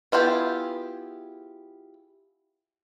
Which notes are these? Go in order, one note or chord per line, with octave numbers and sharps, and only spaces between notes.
B3 E4 F4 G4 G#4